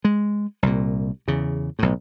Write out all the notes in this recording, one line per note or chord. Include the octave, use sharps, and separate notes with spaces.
G#3
C2 A#2
E2 C#3
B1 A2